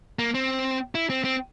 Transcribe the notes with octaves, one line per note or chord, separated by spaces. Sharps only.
A#3
C4
E4
C4
C4